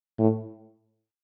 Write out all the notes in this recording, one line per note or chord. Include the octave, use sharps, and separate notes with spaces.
A2